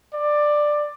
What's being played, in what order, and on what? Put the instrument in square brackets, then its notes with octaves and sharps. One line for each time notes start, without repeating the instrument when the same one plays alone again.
[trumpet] D5